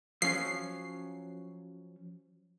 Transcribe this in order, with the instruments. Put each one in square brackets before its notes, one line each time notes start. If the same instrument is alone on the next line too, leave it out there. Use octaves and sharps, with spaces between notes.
[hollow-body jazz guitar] F3 F#3 C#4 [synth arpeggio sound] C7